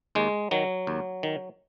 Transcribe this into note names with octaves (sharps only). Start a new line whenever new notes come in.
D#2 G#3
D#3 F#3
D#2
D#3